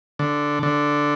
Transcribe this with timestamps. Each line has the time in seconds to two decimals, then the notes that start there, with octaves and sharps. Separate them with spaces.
0.19 D3
0.63 D3